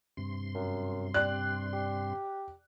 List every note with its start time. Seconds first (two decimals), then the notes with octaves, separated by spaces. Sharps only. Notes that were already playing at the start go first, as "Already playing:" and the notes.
0.17 G2 C3 C6
0.55 F#2
1.14 G4 D5 F#6
1.73 G4